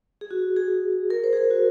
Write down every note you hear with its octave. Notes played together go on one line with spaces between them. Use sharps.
G#4
F#4
G#4
A#4
C5
G#4
A#4
F#4